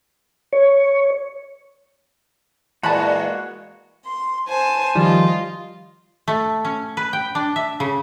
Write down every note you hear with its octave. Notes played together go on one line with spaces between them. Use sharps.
C#5
E2 A#2 G#3 A#3 F#4 A5 B5
C6
C5 G#5 A5
D#3 F3 G3 F4 D#5
A3
C#4
B4
G5
D4
E5
C#3